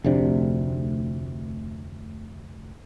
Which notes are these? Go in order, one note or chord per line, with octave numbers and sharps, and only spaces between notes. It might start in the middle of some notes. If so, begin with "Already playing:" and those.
F1 D2 C3 D4